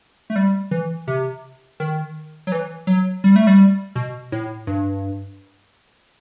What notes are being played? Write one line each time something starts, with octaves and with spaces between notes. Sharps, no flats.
A3
G3
E3
C3
D#3
F#3
E3
F#3
G3
A3
G3
B2
A2
G2